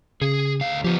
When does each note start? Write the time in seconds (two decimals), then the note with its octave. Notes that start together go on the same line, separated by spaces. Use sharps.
0.22 C#3 G#4
0.61 D2 F5
0.84 F3 B3 G4